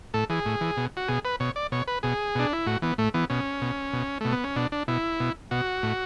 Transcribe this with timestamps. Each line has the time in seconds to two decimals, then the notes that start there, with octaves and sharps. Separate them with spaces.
0.14 A2 A4
0.30 E3 G#4
0.46 A2
0.61 E3
0.77 B2
0.97 F#4
1.08 B2 G#4
1.25 B4
1.40 B2 C#5
1.56 D5
1.72 B2 C#5
1.88 B4
2.03 B2 G#4
2.35 B2 D4
2.53 E4
2.67 A2 F#4
2.82 E3 B3
2.98 A2 A3
3.14 E3 B3
3.30 B2 C#4
3.61 B2
3.93 B2
4.21 B2 A3
4.32 B3
4.44 C#4
4.56 B2 D4
4.72 D4
4.88 B2 E4
5.20 B2
5.51 B2 F#4
5.83 A2